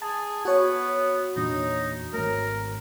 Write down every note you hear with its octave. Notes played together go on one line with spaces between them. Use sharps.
G#4 A5
B3 F#4 C#5
E2 A#2 D4 D#4
G#1 A3 A#4